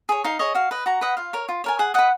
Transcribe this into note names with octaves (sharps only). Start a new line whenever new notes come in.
G#4 C#5
D#4 F5
G#4 C#5 D#5
F#4 F5
B4 D#5
F#4 A#5
B4 D#5 F#5
F4 F5
A#4 C#5
F4
A#4 C#5 G#5
G#4 F#5
B4 D#5 F#5